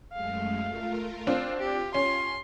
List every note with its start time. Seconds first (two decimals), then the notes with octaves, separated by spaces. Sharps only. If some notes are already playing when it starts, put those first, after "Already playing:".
0.13 F#2 G#3 A3 F5
0.65 A3 F4 A#4
1.27 C4 D4 F4
1.59 F4 G4
1.94 C#4 C6